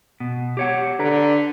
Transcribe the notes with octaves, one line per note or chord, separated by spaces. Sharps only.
B2
G4 C#5 F#5
D3 B4 A#5